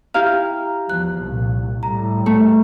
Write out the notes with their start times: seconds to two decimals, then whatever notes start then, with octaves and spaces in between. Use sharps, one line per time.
0.14 E4 G4 F5 A#5
0.89 E2 F3 F#6
1.22 C2 A#2
1.83 A2 G3 A#5
2.26 A3